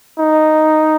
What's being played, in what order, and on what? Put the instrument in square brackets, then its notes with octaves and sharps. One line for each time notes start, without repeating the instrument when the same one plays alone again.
[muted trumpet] D#4